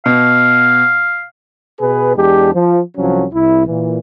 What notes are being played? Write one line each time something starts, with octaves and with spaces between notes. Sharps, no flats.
B2 F5
B2 G#4 B4
E2 G#3 D4 G4
F3
C2 F3 F#3 C#4
C2 E4
A#2 E3